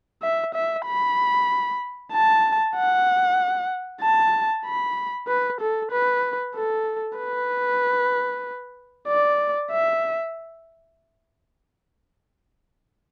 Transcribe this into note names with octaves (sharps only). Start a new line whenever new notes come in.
E5
E5
B5
A5
F#5
A5
B5
B4
A4
B4
A4
B4
D5
E5